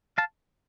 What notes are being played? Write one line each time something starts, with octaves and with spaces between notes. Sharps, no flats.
F5 A5